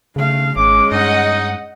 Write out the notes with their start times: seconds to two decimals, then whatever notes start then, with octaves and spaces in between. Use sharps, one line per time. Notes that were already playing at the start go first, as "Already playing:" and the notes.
0.16 C#3 A3 F5
0.56 G#1 G#3 C#4 D6
0.92 G2 D#4 D#5 F#5